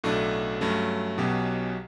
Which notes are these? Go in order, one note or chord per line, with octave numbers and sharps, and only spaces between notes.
B1 A2 F#3 A3 D4
G2 F#3 A3 C#4
B1 B2 F#3 C#4 G4